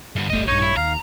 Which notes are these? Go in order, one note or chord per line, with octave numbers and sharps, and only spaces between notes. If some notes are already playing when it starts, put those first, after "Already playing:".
G2 D3
D1 G1 G3 A3 D#5
A#1 G2 D#4 C#5
E4
D#2 F5 A#5